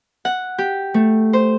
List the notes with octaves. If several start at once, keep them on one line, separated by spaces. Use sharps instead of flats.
F#5
G4
A3
C5